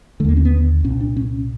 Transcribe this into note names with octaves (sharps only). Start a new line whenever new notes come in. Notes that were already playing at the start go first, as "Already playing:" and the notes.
D#2 D3 A3 A#3
C#4
B3
C2 A#2 C#4
D4
C#4